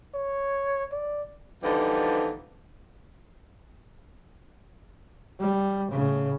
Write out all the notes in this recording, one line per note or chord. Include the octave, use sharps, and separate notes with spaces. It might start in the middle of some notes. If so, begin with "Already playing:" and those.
C#5
D5
D3 E3 F3 G3 B3 D#4
G3
A2 C#3